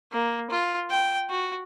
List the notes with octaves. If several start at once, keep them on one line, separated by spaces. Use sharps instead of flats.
A#3
F4
G5
F#4